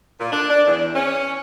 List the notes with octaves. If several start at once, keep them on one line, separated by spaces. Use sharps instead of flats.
A#2
D4
D4
E2
C#4